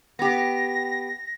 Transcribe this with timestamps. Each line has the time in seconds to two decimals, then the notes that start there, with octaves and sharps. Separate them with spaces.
0.19 B3 G4 A#6